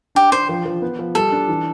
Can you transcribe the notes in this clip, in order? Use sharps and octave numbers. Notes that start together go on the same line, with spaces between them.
D4 G4
D4 C5
F3
F3
B3
F3
G3 A4
D4
E3